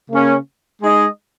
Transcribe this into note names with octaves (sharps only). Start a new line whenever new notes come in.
C#3 A#3 C#4
G#3 D#4 G#4 D#5